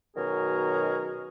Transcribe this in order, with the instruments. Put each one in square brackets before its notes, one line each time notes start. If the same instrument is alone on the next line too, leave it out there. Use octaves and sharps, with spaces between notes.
[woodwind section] B2 D#3 F#3 C#4 G#4 A#4